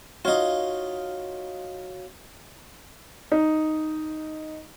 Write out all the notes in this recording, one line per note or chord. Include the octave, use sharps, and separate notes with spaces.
D#4 F4 F#4 C#5 F5
D#4